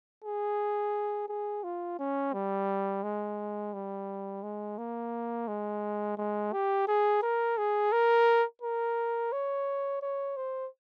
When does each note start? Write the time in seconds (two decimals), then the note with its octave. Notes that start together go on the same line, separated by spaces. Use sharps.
0.24 G#4
1.29 G#4
1.64 F4
1.99 C#4
2.33 G3
3.04 G#3
3.74 G3
4.43 G#3
4.78 A#3
5.48 G#3
6.18 G#3
6.53 G4
6.88 G#4
7.23 A#4
7.58 G#4
7.92 A#4
8.62 A#4
9.32 C#5
10.02 C#5
10.37 C5